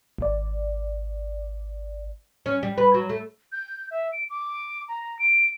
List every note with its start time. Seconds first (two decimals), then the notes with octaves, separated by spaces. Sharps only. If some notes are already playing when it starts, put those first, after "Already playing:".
0.18 G#1 D5
2.46 C#4
2.63 G3
2.78 B4
2.94 F#3
3.09 A3
3.52 G6
3.91 E5
4.12 D7
4.30 D6
4.88 A#5
5.19 D7